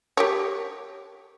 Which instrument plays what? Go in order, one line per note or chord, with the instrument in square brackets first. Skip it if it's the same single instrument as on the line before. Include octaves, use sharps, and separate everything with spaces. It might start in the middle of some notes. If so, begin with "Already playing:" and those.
[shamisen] G4 A#4 C#5